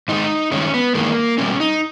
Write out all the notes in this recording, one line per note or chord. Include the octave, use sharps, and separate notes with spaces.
G#2 D#3 G#3 D#4
G2 D#3 G#3 C#4
B3
G2 D#3 G#3 A#3
B2 G3 C#4
D#4